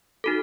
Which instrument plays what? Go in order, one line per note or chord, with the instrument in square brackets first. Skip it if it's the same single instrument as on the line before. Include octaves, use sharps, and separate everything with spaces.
[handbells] D#4 F#4 A4